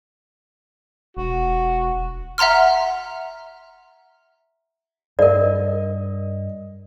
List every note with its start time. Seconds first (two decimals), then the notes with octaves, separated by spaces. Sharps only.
1.17 E1 F#4
2.38 E5 F#5 A#5 C6 F6
5.19 G2 A#4 D5 D#5